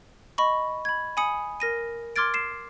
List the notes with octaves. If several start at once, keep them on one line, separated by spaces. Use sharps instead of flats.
D#5 B5 C#6
B5 G#6
G#5 B5 D#6 C#7
A#4 A#6 D#7
C6 D6 F6 G#6 A6 D7
C7 E7